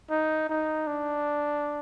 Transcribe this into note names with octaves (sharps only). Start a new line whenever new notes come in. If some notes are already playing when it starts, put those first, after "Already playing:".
D#4
D#4
D4